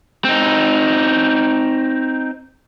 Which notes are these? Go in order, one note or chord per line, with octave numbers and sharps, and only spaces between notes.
C4 D#4